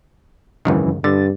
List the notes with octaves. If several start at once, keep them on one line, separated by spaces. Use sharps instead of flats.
G#1 C#2 F#2 D#3 E3
G2 D3 A6